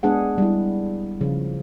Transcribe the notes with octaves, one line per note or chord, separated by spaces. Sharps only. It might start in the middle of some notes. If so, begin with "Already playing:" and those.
G#3 B3 D4 G#4 F#5
G3 E4
C#3 F3